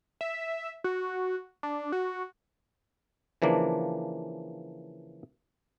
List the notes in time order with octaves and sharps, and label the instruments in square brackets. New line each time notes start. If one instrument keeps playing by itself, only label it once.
[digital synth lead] E5
F#4
D4
F#4
[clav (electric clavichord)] C#3 E3 F3 A#3 D4